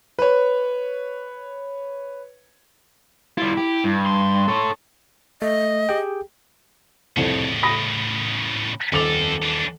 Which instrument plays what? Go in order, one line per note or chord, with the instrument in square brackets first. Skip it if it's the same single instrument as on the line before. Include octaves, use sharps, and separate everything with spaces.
[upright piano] B4 C#5
[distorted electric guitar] G3 F4 [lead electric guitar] E4
[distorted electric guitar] G4
G2
[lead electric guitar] C6
[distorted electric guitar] A4 C#5
[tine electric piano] A3 [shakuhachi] D#5
[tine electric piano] G4 G#4 G5
[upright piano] C2 F2 [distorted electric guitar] A2 C#3
[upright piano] B5 D#6 A#6
[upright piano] D#1 D6 F7 [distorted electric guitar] F2 A4
[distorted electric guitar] E3 D4